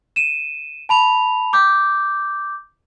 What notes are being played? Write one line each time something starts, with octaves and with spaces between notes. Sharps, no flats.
D#7 E7
A5 B5 F7
D6 G6